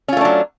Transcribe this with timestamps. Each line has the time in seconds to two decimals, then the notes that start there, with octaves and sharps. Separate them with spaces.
0.08 C#4
0.13 F4
0.17 A3
0.21 D4
0.25 F#3